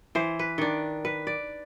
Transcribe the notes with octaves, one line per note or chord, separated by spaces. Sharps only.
E3 C5
B4
D#3 D4
B4
D5